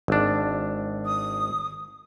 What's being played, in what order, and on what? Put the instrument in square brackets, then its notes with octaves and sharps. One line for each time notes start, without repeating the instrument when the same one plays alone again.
[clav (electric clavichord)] G#1 D4
[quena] D#6